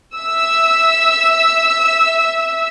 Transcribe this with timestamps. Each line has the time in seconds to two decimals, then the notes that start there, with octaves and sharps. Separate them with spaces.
0.17 E5 E6